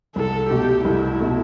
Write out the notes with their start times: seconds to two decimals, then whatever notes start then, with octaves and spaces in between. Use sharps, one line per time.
0.16 C2 A4
0.50 B2 A3 G4
0.85 C2 E4
1.20 B2 A3